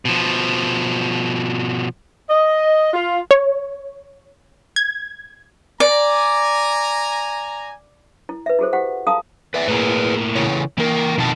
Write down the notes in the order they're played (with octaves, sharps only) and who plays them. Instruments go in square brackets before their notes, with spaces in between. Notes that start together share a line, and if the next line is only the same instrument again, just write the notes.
[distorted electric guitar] B2 F3
[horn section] D#5
F4
[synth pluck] C#5
G#6
[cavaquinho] D5 [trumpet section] G#5 A#5
[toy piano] E4
B4 E5
E4 F#4 G#4 A4 C5
E4 G4 C5 F#5
F4 A4 F5 A5 A#5 D#6
[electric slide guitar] B4 D5 E5
[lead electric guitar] A2 A#3 [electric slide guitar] G#4 B4
[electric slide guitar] C#3 E3 C#5
[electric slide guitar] E3 A#4 [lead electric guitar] A#3
[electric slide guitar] F2 D#3 A5 [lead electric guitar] B2